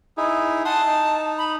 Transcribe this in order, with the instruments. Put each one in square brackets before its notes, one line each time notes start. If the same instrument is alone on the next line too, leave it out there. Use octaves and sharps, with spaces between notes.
[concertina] D#4 E4 G#4
[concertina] F#5 C6 D#6 [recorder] A5
[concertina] D#4
[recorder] B5